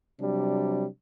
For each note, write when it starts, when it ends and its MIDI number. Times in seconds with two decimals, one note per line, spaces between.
0.19 0.86 48
0.19 0.86 54
0.19 0.86 55
0.19 0.86 62